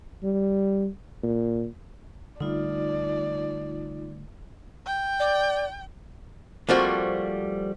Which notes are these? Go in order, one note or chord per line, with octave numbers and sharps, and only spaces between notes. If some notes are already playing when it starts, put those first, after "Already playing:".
G3
A#2
D3 G3 A3 D#4 F4 D5
G5
D5
F3 G3 A3 A#3 C4 F#4